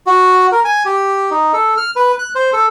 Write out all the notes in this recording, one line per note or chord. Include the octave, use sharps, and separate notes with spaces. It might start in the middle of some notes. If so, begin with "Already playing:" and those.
F#4
A#4
G#5
G4
D#4
A4
F6
B4
F#6
C5
A4